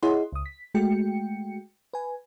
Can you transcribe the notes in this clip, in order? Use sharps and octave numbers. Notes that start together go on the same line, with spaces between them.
E4 G#4 C#5 D#5 F#5 C6
C#2 D#6
B6
G#3 A3 F#4 G5 C#7
B4 G#5